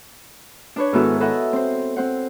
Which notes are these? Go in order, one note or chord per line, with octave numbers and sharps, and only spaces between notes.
D4 B4 C#5
G#2 D#3 B3 E4 F#4 A4
A4 B4 D#5 E5 F#5
C4 C5
C4 C5 F#5